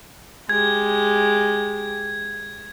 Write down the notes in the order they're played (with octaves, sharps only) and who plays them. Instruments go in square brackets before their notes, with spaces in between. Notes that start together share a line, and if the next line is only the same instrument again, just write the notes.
[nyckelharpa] G#3 G4 [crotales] G#6